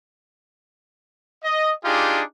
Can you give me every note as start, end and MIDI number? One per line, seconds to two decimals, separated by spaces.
1.44 1.72 75
1.85 2.22 62
1.85 2.22 63
1.85 2.22 65
1.85 2.22 67
1.85 2.22 68